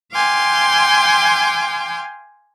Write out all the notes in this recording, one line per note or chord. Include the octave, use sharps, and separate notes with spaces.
F5 G5 G#5 C6 D6